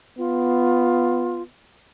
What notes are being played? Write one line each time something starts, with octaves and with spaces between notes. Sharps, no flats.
B3 F4